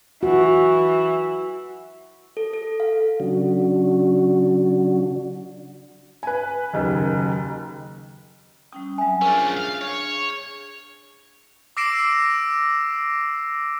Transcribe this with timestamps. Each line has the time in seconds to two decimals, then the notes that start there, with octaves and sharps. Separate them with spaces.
0.23 E3 F#4
2.37 A4
2.53 A4
2.80 F5
3.20 C#3 F#3 D4 F#4
6.23 B4 G#5
6.73 F#1 D#2
8.73 G3 C#4 G5 D#6
8.98 F#3 C4 E5 G#5
9.22 C#4 D4 F4 G#4 A#4 C5
9.57 F5
9.81 C#5
11.77 D6 E6 A#6 C7 D7 E7